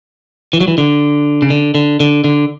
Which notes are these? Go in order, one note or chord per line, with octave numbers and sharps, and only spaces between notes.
E3
F#3
E3
D3
C#3
D3
D3
D3
D3